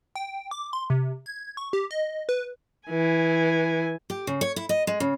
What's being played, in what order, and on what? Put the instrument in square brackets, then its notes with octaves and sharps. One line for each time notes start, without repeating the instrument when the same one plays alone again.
[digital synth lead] G5
D6
C6
C3
G#6
C#6
G4
D#5
B4
[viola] E3 G#5
[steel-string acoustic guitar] G4
C#3
C#5
E4
D#5
G#3
C#3